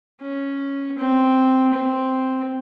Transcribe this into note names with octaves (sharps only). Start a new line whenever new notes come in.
C#4
C4
C4